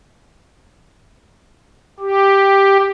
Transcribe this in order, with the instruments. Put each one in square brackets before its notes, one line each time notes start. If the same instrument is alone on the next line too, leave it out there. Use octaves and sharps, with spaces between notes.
[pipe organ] G4